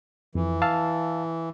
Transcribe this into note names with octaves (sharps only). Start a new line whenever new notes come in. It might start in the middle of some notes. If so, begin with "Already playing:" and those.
F2 E3
F5 A5 E6